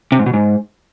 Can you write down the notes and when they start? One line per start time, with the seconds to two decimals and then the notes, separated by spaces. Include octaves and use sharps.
0.12 C3
0.19 G#2
0.26 B2
0.33 G#2